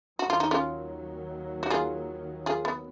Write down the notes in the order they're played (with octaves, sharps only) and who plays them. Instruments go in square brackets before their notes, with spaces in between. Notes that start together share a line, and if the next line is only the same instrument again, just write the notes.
[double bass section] D#2 D#3 F#3 [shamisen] F#4
[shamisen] F4
D#4
C#4 F4
F#4
F4 G#4
F4 G#4
B3